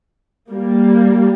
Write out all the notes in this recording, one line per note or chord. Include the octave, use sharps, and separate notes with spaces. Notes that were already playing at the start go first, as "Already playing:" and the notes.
G3 A#3